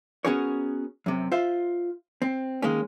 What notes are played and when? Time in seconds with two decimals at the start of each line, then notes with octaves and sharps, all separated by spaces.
0.25 B3 C#4 F#4 G#4 A#4 C#5
1.06 F#2 C3
1.32 F4 C5 E5
2.22 C4
2.62 D#3 G#3 A#3 C#4